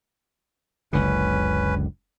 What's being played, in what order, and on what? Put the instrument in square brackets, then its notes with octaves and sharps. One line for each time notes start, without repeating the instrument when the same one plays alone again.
[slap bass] F#1 C#2 D3 [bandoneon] C#4 B4